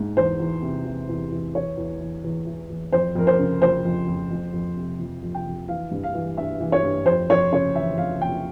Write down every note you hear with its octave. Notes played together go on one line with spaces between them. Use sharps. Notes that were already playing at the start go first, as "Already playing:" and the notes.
Already playing: G#2
E2 C5
E2
C3
E3
E2
E2
E3 C#5
E2
E3
E2
E3
E2
F2 C5
F2 A#4
C5
C#3
F3 C5
F2
F2
F2
F2
C3
F3
F2
G5
F2
E3 F5
G2
F5
E3
G2 E5
E3
C#5
G2
F2 C5
F2 C#5
C#3 C#5
E3 E5
F2 F5
F2 G5